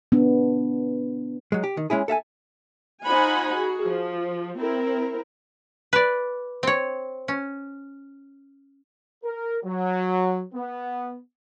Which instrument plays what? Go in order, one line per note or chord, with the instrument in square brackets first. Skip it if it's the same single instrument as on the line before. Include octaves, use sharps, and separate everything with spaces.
[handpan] B3 D4
[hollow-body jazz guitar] F#3 G#3
G4
D#3
G#3 C#4 E4 G#4
A4 E5 F5 G#5
[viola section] D#4 F4 C5 F#5 G#5 B5
F#4 G#4
F3
C4 E4 A#4
[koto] B4 D5
C4 C#5
C#4
[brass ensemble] A#4
F#3
B3